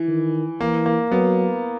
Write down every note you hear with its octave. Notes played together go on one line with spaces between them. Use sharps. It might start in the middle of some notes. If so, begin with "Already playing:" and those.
Already playing: E3
D#3
E3 A#3
A#3
F#3 B3